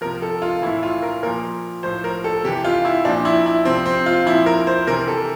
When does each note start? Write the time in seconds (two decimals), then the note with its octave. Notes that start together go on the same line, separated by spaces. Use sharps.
0.01 C3 F3 A#4
0.22 A4
0.42 F4
0.62 A2 E3 E4
0.83 F4
1.02 A#4
1.23 A#2 F3 A#4
1.83 A2 F3 C5
2.04 A#4
2.24 A4
2.44 C3 E3 G4
2.64 F4
2.85 E4
3.05 A#2 F3 D4
3.25 E4
3.46 E4
3.65 C3 F3 C4
3.86 C4
4.06 F4
4.26 A#2 F3 E4
4.46 A#4
4.67 C5
4.87 C3 E3 A#4
5.08 A4